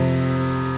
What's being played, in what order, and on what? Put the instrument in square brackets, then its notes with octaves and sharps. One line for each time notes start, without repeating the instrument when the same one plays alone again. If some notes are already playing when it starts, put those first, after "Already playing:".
Already playing: [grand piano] F2 C3